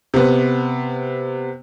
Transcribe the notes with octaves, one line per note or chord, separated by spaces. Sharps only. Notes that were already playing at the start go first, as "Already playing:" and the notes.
C3 B3